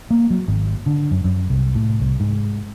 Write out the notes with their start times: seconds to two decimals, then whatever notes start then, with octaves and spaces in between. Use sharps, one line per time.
0.10 A#3
0.30 F#3
0.48 G#1
0.86 D3
1.11 F#2
1.24 F#2
1.50 C2
1.75 A2
2.00 C2
2.20 G#2